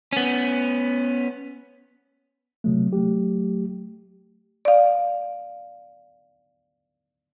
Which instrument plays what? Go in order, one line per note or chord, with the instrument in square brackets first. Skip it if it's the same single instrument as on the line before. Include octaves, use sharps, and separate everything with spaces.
[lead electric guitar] B3 C#4
[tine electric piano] C3 F#3 A3
F#3 A3 G4
[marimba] D5 F5